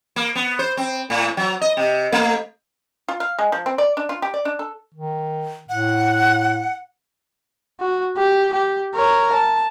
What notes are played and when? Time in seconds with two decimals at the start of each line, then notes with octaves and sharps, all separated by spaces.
0.16 A#3
0.35 B3
0.59 C5
0.77 C4
1.10 A2
1.37 F#3
1.61 D#5
1.77 C3
2.12 A3
3.08 F4
3.20 F5
3.39 G#3
3.52 F3
3.66 C4
3.78 D5
3.97 D4
4.09 F4
4.22 G4
4.34 D5
4.45 D4
4.59 A4
4.94 D#3
5.69 A2 F#5
7.80 F#4
8.17 G4
8.53 G4
8.95 A#4 C#5
9.33 A5